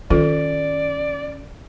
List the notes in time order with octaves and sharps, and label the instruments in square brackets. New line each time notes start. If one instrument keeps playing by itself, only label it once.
[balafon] D#3 F4 A4 [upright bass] C#4 [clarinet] D5